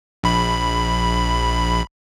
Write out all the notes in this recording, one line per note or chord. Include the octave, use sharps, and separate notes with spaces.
A#1 B5